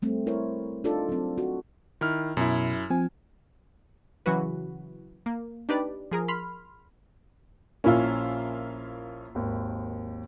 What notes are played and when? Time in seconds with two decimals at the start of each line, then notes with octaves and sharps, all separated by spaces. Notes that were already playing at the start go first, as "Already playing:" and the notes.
0.02 G3 A3 C4
0.27 E4 A#4 C5 C#5
0.84 D4 D#4 F4 A4 D5
1.09 F#3 C4
1.38 F#4
2.01 D#3 E4 F6
2.37 F#2 B2 E4
2.90 F3 C4 G#5
4.26 C#3 E3 F#3 F#4 B4
5.26 A#3
5.69 D4 D#4 G4 B4 D5
6.11 F3 G#4 A#4
6.28 B5 C6 F6
7.84 A#1 A#3 C#4 E4 F4
9.35 G#1 D#2